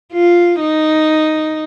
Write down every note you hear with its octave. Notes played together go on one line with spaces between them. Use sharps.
F4
D#4